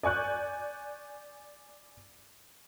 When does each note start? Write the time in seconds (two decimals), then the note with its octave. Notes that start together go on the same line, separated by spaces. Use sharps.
0.03 D5 G#5 C#6 F#6 G6